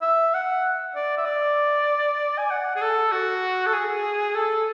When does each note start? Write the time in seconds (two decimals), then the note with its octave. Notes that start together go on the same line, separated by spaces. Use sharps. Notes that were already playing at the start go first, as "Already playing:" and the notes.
0.02 E5
0.34 F#5
0.96 D5
1.17 E5
1.26 D5
2.38 G#5
2.51 F#5
2.76 G#4
2.81 A4
3.12 F#4
3.67 A4
3.73 G#4
4.35 A4